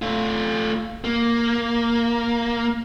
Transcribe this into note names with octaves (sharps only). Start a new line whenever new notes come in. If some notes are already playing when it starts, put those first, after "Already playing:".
A3 F4
A#3